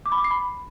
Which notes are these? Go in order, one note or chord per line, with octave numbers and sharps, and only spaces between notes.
D6
B5
D6
C7
B5